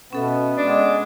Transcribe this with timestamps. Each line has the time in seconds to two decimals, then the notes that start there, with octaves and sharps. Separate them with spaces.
0.13 B2 B3 C#4 A4 E5
0.57 G#3 D4